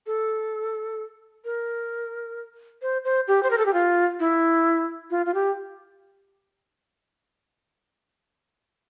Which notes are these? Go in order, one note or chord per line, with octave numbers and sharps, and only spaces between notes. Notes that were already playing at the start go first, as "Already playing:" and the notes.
A4
A#4
C5
C5
G4
C5
A#4
A4
G4
F4
E4
F4
F4
G4